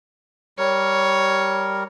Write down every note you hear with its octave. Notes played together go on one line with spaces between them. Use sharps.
G3 A#4 C#5